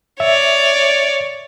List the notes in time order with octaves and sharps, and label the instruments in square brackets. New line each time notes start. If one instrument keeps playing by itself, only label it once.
[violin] C#5 D5 [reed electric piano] E5